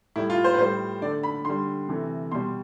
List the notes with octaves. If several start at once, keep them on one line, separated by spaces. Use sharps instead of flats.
A2 G3 E4
F4
C5
B4
A2 G3 C5
D3 A3 D5
B5
D3 G3 C6
C3 E3 A3
B2 G3 C6